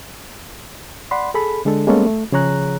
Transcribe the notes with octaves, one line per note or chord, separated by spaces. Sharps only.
D5 F#5 B5 C6
G#4 A4 B5
D3 G#3 D4 A4
G3 G#3 A#3 B3 C#4 A4
A3
C#3 F3 G#4 C#5 A#5 F#6